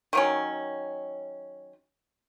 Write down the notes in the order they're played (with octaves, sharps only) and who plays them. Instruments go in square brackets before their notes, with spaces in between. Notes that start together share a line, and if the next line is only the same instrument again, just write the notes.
[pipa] D#3 F#3 C#4